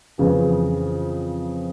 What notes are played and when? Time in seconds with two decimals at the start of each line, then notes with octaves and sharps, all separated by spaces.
0.18 F2 C#3 E3